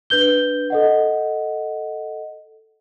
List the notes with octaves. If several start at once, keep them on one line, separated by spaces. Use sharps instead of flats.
D4 B4 G6 G7
A4 D#5 F#5